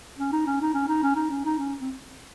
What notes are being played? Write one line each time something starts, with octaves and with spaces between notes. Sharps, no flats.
C#4
D#4
C#4
D#4
C#4
D#4
C#4
D#4
C#4
D#4
C#4
C4